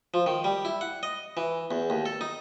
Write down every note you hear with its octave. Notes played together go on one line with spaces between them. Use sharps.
F3
D#3
G3
E4
F#5
D#5
E3
E2
D#2
A4
D#4